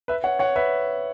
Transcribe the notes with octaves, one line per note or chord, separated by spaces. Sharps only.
B4 E5
C#5 F#5
C#5 F#5
B4 E5